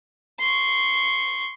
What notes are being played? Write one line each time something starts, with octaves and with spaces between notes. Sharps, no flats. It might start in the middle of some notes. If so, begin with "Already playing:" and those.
C6 C#6